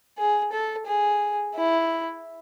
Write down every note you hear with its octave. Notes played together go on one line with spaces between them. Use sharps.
G#4
A4
G#4
E4